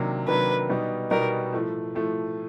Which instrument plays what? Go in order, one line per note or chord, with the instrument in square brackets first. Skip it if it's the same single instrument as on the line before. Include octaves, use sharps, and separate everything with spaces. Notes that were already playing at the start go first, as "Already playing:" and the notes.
Already playing: [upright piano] C3 D#3 F#3 A#3 D4
[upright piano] C3 D#3 F#3 A#3 D4 [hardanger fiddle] B4
[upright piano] B2 G3 B3 D#4
[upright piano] B2 G3 B3 D#4 [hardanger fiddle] A#4
[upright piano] A2 F3 A3
A2 F3 A3